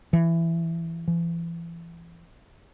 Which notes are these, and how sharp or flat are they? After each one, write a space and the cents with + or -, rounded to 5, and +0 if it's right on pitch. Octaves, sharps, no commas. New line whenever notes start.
E3 +15
E3 +35